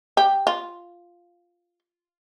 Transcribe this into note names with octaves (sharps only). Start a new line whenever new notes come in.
G4
F4